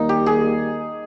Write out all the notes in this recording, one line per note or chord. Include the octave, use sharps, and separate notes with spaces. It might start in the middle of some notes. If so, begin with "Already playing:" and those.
Already playing: D#2 D#3 G3 A#3 D#4
G4
G#4